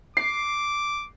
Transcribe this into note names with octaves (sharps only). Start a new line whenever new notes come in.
D6 C7